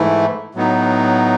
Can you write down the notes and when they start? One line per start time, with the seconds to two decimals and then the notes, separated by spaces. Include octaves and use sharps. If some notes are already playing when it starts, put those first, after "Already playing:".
Already playing: G#2 E3 A3 E4
0.55 A2 F#3 B3 D#4